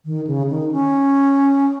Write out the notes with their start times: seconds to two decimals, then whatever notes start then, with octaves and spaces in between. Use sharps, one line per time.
0.05 D#3
0.27 C#3
0.49 D#3
0.72 C#4